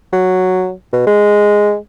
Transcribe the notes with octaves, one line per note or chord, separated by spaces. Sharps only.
F#3
B2
G#3